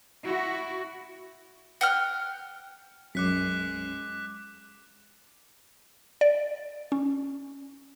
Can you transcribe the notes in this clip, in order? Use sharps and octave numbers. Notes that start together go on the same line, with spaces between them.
E4 F#4
F#5 G5 F6
B1 F#2 G#3 C#4 D6 F#6 B6 C7
D5
C#4